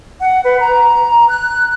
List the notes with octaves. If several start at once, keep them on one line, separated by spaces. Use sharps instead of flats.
F#5
B4
A#5
F#6